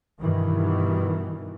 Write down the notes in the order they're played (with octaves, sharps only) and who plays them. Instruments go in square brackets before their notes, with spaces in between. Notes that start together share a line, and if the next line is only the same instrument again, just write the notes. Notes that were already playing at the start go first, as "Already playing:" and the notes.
[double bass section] G2 B2 D#3 E3